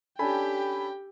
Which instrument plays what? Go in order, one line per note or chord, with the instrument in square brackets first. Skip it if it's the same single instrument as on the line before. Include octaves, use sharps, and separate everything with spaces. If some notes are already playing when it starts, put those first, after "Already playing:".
[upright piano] C#4 D4 A4 [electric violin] G4 G5 [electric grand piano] G#5 B5